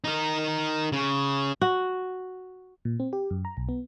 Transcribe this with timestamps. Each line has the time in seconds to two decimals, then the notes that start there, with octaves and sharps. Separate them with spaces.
0.04 D#4 A#4
0.92 C#3
1.61 F#4
2.85 A#2
3.00 C4
3.13 G4
3.31 F#2
3.45 A#5
3.57 B1
3.69 B3